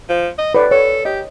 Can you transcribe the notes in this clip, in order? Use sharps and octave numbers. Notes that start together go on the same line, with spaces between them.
F3
D#5
A2 B4 D5
A4 C#5
G4 D#5